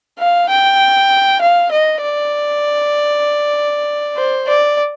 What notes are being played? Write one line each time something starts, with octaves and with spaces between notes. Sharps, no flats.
F5
G5
F5
D#5
D5
C5
D5